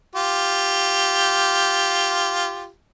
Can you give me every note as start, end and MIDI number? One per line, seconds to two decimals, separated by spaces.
0.15 2.70 65
0.15 2.70 67